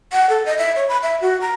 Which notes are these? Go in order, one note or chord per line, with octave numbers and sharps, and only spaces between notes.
F#5
A4
D#5
E5
C#5
B5
E5
F#4
A#5